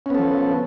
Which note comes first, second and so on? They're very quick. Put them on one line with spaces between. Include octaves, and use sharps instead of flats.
C#4 B3 A4 F3